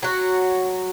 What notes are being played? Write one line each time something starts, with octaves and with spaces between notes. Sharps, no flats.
F#3 F#4